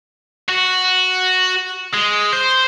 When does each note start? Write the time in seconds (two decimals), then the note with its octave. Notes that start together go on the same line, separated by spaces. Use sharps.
0.48 F#4
1.93 G#3
2.33 C5